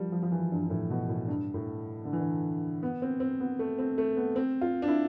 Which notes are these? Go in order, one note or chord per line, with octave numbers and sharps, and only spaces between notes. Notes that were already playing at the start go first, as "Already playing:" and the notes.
Already playing: F3 G3
F3
F3
E3
G2
G2
A2
B2
A2
G2
A2
D3
E3
D3
B3
C4
C4
B3
A3
C4
A3
B3
C4
F4
D4
E4